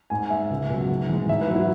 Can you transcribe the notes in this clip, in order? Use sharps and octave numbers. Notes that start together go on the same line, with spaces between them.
G#2 G#5
G#3 E5
C#2
B2 F#3
G#2
E3 G#3
G#2 E5
B4
F#3
E4